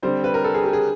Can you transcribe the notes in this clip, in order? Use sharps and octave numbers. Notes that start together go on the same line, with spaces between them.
D3 G3 C4 C5
B4
A#4
A4
G#4
G4
G#4